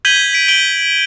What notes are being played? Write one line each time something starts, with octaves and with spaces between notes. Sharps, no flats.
G6 G#6 B6 D#7 F#7 G7
B6 D7
D7 F#7 G7